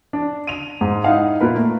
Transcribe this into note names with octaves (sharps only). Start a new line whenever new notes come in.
D4
D#7 F7
G#2
D#4 E4 F5 F#5
A#2 A#3 A#4 B4
A3